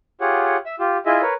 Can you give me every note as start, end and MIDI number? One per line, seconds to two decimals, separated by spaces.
0.21 0.57 65
0.21 0.57 67
0.21 0.57 68
0.21 0.57 73
0.21 0.57 78
0.66 0.75 76
0.66 0.75 88
0.79 0.97 65
0.79 0.97 67
1.06 1.22 64
1.06 1.22 65
1.06 1.22 68
1.06 1.22 75
1.06 1.22 76
1.22 1.34 70
1.22 1.34 71
1.22 1.34 73